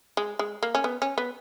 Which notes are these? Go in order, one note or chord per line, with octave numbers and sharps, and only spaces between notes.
G#3
G#3
A#3
C#4
B3
C#4
B3